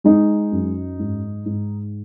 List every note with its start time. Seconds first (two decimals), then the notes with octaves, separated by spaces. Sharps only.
0.04 G#3 D#4
0.52 F#2
0.99 G#2
1.46 G#2